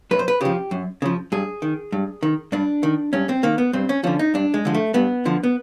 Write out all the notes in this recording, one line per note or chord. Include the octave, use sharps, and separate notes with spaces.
F#2 B4
C5
B4
C#3 F3 G4
F#2
C#3 F3
G2 G#4
D#3
G2
D#3
G2 D4
D#3
G2 C#4
C4
D#3 A#3
B3
G2 C4
C#4
D3 F3 C#4
D#4
G2 D4
G#3
D3 F3
A3
G2 B3
D3 F3
B3